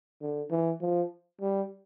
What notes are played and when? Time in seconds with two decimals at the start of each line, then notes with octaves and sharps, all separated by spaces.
0.21 D3
0.51 E3
0.81 F3
1.41 G3